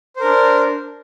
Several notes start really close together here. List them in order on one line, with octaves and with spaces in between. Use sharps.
C5 A#4 D4